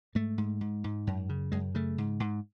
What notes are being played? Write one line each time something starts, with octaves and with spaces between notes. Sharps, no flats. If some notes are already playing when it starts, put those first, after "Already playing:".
G#2 A3
G#2
G#2
G#2
F#2
C#3
F#2 G#3
C#3 A3
G#2
G#2